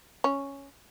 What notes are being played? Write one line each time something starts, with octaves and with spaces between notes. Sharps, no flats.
C#4